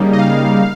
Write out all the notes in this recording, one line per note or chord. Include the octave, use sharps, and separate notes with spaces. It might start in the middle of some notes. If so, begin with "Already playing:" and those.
Already playing: C#3 G3 A#3 D#4
D#5
F5